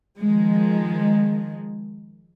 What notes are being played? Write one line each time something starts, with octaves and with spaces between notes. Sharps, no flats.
D#3 F3 G#3